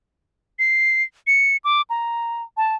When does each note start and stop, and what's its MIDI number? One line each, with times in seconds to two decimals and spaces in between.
0.59 1.03 96
1.27 1.57 97
1.64 1.82 86
1.90 2.43 82
2.57 2.75 81